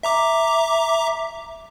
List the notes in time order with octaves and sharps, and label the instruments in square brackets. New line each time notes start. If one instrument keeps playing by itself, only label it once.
[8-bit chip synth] E5 A#5 D6